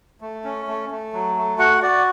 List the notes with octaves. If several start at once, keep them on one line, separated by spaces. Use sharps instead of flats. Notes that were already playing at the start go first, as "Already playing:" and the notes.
A3
C#4
A3
A3
F#3
A3
F#4 F#5
F#4 D5